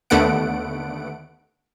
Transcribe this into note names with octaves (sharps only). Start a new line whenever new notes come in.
D#2 D3 A3 B3 F#5 D7